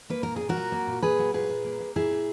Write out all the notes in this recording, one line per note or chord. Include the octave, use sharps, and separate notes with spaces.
A#3 B4
A#2 A#4
A#2 G#4
F#4 A#4
F#3
A#3
A#2
A#2 G#4 B4
F#3
A#2 G#4 B4
A#2
A#3
A#3
A#2 E4 G#4
A#2